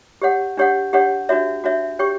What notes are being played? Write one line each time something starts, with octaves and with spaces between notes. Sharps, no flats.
G4 C#5 F#5
D4 G4 C#5 F#5
D4 G4 C#5 F#5
D4 F#4 C#5 E5
D4 F#4 C#5 E5
G4 C#5 G5 C#6